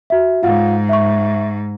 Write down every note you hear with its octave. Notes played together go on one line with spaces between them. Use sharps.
F#4 E5
G#2 F4 F5 F#5
E5 C#6